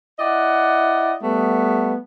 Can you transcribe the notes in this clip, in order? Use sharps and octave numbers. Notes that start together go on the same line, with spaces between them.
E4 D5 D#5 F#5
G3 A3 B3